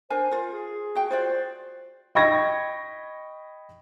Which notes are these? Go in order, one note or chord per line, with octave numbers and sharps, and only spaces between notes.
D4 A#4 C5 G#5
F4 A#4
G#4
F#4 G5
F4 F#4 C5 D5
D#5 G5 B5 C#6 G#6 A#6